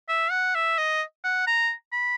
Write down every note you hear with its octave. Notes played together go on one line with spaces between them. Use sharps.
E5
F#5
E5
D#5
F#5
A#5
B5